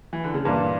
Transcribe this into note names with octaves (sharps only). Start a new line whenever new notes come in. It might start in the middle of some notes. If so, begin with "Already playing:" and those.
E3
D3
C#3
G2 A#2 E3 A#3 D4